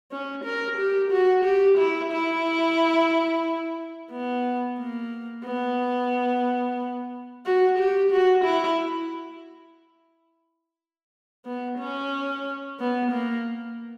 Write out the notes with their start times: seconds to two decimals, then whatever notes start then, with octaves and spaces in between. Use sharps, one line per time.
0.12 C#4
0.45 A#4
0.78 G4
1.11 F#4
1.45 G4
1.78 E4
2.12 E4
4.12 B3
4.79 A#3
5.45 B3
7.46 F#4
7.79 G4
8.12 F#4
8.45 E4
11.45 B3
11.78 C#4
12.80 B3
13.12 A#3